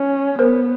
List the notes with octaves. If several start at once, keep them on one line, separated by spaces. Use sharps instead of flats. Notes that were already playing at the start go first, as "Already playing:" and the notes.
Already playing: C#4
B3 A#4 C5